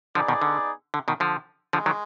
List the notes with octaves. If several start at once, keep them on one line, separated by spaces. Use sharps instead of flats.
D3 F3 B3 D#4 G#4 D5
B2 D#3
D3
D3
B2 D#3
D3 F3
D3 F3 G#3
D#3 F#3